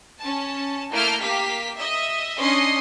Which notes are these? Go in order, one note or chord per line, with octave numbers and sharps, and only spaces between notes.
C#4 A5
A3 A#3 E4 F6 G6 D7
A#3 G4 F5 B6
D#5 E5
C#4 D4 D#5 C6 C7